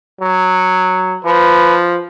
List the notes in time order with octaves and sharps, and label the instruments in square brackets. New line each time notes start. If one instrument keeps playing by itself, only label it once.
[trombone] F#3
[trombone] F3 [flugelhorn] B4